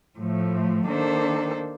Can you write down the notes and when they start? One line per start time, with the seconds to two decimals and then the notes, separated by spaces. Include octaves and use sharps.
0.19 A2 F3 A3
0.85 D#3 A#3 D4 A4 C5